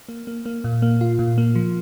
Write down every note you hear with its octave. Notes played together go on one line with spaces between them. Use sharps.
A#3
A#3
A#3
A#2
A#3
F4
A#2
A#3
F3